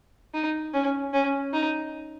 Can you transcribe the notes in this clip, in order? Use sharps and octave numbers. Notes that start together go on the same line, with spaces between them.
D#4
C#4
C#4
D#4